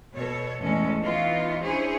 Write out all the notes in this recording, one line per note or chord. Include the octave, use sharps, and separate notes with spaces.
B2 A4 C#5
E2 A2 G#3 C#4 A4
E3 B3 D#4 F4 C#5
C#4 D4 E4 G#4 C5 C#5